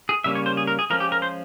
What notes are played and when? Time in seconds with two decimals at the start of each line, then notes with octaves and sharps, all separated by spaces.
0.09 G#4
0.24 C#3 G3 A#3 C#4 E5
0.35 C#5
0.46 C5
0.57 G#4
0.67 A#4
0.79 G#4
0.90 F3 G#3 C#4 A#4
1.00 G4
1.12 A#4
1.22 C5